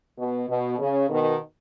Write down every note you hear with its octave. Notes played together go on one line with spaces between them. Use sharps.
B2
B2
C#3
B2 D#3